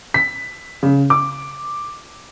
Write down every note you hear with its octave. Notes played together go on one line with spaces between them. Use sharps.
B6
C#3
D6